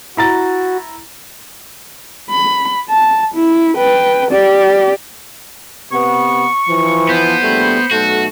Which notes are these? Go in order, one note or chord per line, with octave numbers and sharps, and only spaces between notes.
E4 F#4 A#5 A6
B5
A5
E4
B4 G5
G4 D5
C3 B3 C#6
E3 F3
B3 C5
A#1 G3 A3
B1 A3 F#4